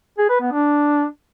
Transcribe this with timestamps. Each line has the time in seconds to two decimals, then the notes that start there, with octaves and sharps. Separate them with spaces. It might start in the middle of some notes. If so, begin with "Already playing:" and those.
0.18 G#4
0.29 B4
0.41 B3
0.52 D4